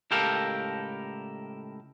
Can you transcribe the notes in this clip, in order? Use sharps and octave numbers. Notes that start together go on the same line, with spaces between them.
C#2 A2 G4 A4 A#4 F5